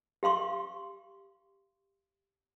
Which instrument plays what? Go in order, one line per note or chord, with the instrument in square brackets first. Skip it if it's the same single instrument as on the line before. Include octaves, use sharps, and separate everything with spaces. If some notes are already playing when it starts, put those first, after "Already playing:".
[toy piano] G4 F5 C6 C#6